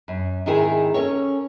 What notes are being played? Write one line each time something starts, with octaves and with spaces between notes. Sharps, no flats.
F#2
G#2 C3 D#3 E4 G#4 A#4
C#4 A4 A#4 C#5